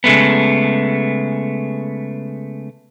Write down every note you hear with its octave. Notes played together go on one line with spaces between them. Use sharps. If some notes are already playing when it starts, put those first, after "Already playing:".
C#3 G#3 A3 B3